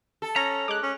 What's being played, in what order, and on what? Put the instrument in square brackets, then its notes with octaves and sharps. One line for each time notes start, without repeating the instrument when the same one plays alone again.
[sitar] A4
[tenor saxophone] C#4 [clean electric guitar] A#5 [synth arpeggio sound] A#6
[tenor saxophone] G#3 [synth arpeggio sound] D6 F#6
[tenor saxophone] C#4